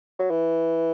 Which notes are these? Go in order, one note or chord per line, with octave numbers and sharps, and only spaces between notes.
F#3
E3